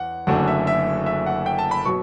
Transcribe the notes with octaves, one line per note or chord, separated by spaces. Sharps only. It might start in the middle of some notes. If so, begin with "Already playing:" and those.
Already playing: E2 F#5
F#1 F#2 D3 A3 D4 F#5
E5
E5
E5
F#5
G5
A5
B5
B2 F#3 C#6